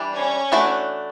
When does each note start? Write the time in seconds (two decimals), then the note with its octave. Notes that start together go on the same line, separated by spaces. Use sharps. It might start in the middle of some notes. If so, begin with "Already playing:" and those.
Already playing: E3 G3 D4
0.16 C#4 C#5
0.52 E3 A3 D4 F#4